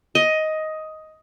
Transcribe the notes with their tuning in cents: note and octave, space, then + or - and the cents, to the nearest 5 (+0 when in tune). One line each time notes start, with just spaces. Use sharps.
D#5 +10